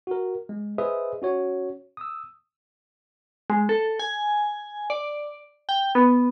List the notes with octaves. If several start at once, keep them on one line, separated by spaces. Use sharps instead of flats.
F#4 A#4
G#3
G#4 B4 C5 D#5 E5 D#6
C#4 F#4 C#5
D#6 E6
G#3
A4
G#5
D5
G5
B3